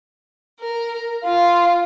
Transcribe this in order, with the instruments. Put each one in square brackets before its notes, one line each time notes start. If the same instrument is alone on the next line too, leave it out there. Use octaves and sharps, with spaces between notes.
[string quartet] A#4
[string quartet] F4 [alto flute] F5